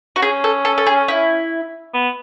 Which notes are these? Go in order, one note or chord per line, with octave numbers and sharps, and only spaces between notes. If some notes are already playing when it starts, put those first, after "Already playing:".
F#4
C#4 G#4
A4
A4
A4
G#4
E4
B3